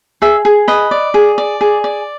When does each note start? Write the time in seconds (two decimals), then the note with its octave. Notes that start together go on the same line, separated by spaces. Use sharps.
0.22 G#4 E5
0.45 G#4
0.68 B4 D#5
0.91 D5
1.14 G#4
1.38 D5
1.61 G#4
1.84 D5